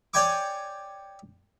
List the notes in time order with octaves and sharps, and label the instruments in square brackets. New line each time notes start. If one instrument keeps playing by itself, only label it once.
[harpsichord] C#5 D5 G5 G#5 C#6 D6